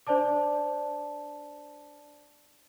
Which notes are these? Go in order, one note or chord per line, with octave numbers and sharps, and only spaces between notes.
D4 C5 D5 A5 D6